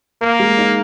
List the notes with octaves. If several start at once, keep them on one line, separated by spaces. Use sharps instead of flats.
A#3 A#4
G#3
D#4